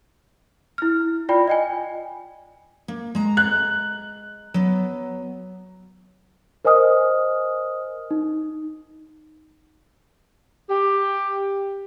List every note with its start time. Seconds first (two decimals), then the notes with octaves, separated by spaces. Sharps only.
0.78 E4 F6
1.29 F4 D5 G5 B5
1.48 D#5 G5 G#5
2.88 A#3
3.15 G#3 A#5
3.37 F#6
4.54 F#3 B3
6.65 A#4 C5 D#5 G#5 D#6 F6
8.11 D#4
10.69 G4